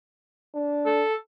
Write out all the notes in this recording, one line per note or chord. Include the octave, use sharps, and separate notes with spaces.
D4
A4